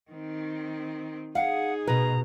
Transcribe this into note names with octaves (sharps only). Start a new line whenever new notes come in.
D#3 C4
D#4 G#4 F5 F#5
B2 B4 A#5